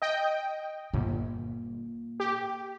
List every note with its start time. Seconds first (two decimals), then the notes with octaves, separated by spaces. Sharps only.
0.02 D#5 G5
0.93 G1 A#2
2.20 G4